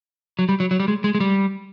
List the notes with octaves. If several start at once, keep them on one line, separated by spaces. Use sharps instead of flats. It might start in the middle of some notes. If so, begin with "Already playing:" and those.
F#3
G3
F#3
F#3
G3
G#3
G#3
G#3
G3